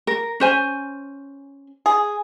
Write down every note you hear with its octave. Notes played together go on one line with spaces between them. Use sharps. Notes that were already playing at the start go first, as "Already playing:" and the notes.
A#4
C#4 C5 G#5
G#4